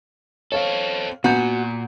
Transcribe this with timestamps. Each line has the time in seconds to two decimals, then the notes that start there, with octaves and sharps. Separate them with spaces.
0.52 C4 A4 C#5 F5
1.24 A#2 B3 F#4 G#5 A#5 G6